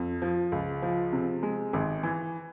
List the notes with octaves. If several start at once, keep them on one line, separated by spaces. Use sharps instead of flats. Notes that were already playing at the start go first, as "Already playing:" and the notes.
Already playing: F2
F3
C#2
F3
C3
G#3
G#1
E3